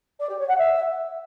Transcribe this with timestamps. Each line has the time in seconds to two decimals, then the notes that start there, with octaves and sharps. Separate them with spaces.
0.20 D5
0.29 G4
0.39 C#5
0.48 F#5
0.58 E5